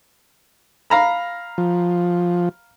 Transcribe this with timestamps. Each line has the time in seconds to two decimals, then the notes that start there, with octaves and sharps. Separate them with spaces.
0.90 F5 A#5 B5
1.58 F3